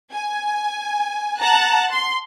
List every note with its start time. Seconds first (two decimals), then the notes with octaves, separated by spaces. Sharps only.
0.13 G#5
1.40 F#5 A5 A#5 F#6
1.90 C6